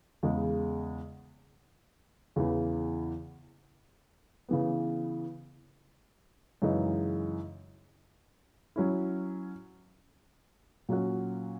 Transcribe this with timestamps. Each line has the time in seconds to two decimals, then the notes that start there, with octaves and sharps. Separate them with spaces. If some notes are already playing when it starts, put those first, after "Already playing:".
0.23 E2 C#3 G#3
2.36 E2 C#3 E3
4.49 C#3 E3 B3
6.62 F#2 C#3 E3 G#3 D#4
8.76 F#3 C#4 E4
10.89 A#2 F#3 C#4 F#4